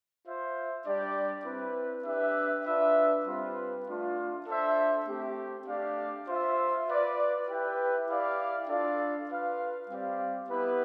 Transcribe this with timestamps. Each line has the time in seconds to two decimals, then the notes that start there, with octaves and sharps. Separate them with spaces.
0.25 F4 C5 E5
0.84 G3 D4 G4 D5
1.45 C4 E4 B4
2.04 D4 G4 B4 E5
2.65 D4 F4 B4 E5
3.25 G3 C4 F4 B4
3.87 A3 D4 F4
4.47 D4 A4 C5 E5
5.06 A3 C4 G4
5.67 A3 D4 G4 D5 F5
6.27 F4 C5 E5
6.87 F4 B4 D5
7.47 E4 G4 B4 E5 G5
8.08 E4 G4 D5 F5
8.68 D4 F4 A4 D5 F5
9.29 F4 B4 F5
9.89 G3 C4 G4 D5 F5
10.49 B3 E4 G4 B4